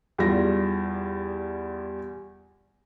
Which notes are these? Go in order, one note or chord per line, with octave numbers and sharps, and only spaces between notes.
E2 G3 F4 A#6